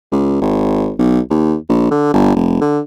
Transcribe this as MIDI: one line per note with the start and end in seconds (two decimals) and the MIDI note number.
0.12 0.41 37
0.41 0.93 32
0.99 1.20 35
1.30 1.55 39
1.69 1.87 34
1.91 2.10 50
2.13 2.32 31
2.36 2.60 29
2.61 2.80 50